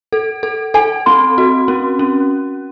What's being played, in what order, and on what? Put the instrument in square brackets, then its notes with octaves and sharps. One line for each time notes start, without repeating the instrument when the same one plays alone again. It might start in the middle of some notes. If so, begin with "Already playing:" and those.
[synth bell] A4
A4
[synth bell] A4 [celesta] G#5
[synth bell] C4 [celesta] C6
[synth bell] F#4
C#4
C#4